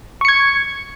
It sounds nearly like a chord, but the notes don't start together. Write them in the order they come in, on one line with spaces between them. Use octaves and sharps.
C#6 C#7 G#6